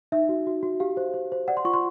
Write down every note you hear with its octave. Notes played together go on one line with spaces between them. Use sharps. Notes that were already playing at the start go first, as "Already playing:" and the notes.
D#4 E5
F#4
F#4
F#4
G4 F5
C5
C5
C5
D5 F#5
C6
F4 C#6
C6